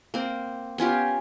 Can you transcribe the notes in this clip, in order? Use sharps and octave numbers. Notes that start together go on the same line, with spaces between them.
A#3 C4
B3 C#4 F4 G4